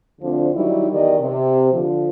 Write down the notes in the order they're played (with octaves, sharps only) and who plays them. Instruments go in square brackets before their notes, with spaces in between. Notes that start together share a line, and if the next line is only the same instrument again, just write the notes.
[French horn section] D2 D3 F3 C4 D4
D#3 F#3 G3 D#4 E4
E2 D#3 G4 D5 D#5
C3
D3 F3